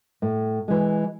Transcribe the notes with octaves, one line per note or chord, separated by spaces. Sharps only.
A2
E3 G#3